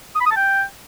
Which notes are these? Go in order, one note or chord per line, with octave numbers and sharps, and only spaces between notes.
D#6
B5
D#6
A5
G5